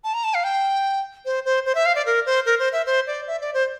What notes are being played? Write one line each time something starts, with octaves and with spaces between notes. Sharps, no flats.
A5
A#5
A5
F5
G5
C5
C5
C5
E5
F5
D5
A#4
C5
A#4
C5
E5
C5
D5
E5
D5
C5